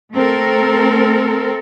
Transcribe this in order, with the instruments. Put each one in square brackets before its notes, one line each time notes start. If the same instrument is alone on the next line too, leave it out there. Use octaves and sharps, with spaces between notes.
[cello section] A3 C4 A4 A#4